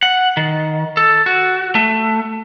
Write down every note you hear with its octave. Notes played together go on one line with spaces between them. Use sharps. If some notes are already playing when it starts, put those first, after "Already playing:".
F#5
D#3
A4
F#4
A3